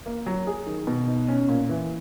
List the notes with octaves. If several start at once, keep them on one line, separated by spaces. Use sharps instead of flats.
A#3
F#3
G#4
D#3
B2
D#4
C#4
A#2
E3